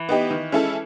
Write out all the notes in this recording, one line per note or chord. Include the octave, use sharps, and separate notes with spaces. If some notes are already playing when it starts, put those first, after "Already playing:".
Already playing: E3
B3 D#4 G4
D#3
G#3 C#4 E4 A4